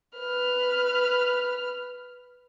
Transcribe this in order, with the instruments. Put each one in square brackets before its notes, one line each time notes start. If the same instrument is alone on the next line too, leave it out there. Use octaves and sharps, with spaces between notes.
[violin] B4 F6